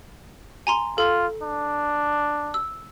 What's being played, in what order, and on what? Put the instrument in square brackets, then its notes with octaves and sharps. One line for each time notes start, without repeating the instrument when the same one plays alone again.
[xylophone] G#5 A#5 C6
[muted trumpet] F4 [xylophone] A4
[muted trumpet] D4
[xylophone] E6